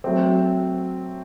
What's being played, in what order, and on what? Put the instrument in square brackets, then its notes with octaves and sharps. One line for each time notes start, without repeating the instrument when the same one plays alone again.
[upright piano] F#3 A3 C4